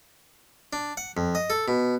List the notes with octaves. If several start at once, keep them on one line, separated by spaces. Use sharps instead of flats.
D4
F#5
F2
D#5
A4
B2